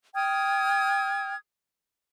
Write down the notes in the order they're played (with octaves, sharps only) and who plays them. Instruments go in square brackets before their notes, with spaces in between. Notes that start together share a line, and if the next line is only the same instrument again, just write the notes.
[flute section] G5 D#6 F6 G#6